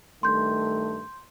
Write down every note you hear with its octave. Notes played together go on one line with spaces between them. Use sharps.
G2 D#3 A3 C6 G6